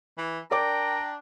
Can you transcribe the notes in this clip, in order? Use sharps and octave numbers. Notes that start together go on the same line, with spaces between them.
E3
D4 A#4 D5 G5 A#5 D6